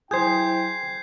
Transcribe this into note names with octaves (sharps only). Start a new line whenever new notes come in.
F#3 E4 G#4 C5 G5 G6 G#6 C7